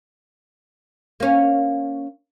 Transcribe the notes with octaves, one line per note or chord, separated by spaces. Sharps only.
A#3 C#4